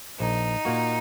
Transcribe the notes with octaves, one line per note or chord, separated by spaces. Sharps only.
A#1 D#4
A#2 A#3 F#4